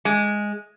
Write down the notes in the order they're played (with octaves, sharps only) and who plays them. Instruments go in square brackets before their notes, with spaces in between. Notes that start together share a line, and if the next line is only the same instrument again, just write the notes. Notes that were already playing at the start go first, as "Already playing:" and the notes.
[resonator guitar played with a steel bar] G#3